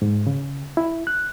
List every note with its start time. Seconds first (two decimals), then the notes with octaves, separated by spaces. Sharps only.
0.02 G#2
0.27 C#3
0.77 E4
1.07 F#6